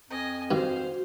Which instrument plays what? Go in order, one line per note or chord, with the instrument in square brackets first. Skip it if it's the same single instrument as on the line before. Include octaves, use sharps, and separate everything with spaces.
[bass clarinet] F2 [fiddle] D#5 G#5
[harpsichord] G2 D#3 [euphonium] F#4 [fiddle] C5 F5